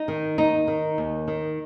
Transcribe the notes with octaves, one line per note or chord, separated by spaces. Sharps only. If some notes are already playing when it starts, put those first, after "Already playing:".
Already playing: D#4
D#3
D#2 D#4
D#3
D#2
D#3